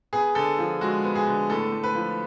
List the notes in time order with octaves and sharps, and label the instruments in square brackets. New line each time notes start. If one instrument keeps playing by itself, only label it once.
[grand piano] B3 G#4
D3 A4
F3
G#3 F#4
B3
G#4
D3
A2 A4
A2
B4
F3